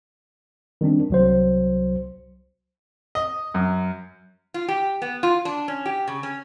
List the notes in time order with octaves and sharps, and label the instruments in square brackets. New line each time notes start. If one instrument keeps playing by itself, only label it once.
[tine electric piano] D#3 G3 C4 D4
C2 F#3 C5
[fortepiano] D#5
F#2
[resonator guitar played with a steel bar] F4
G4
B3
F4
D4
C#4
G4
C#3
C#4